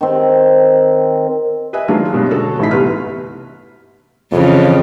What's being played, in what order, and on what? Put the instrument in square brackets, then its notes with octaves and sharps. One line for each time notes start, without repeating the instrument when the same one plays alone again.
[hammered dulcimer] D#3 C4
[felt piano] B4 D#5 E5 G#5
D#3 F#3 G#3 A#3 D4 F4
G2 B2 G#3 C#4
D3 F#4 A4 C#5 A5
A1 E3 D#4 E4 B6
G1 C2 C3 B4 F6
[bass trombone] F2 [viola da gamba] C#3 E3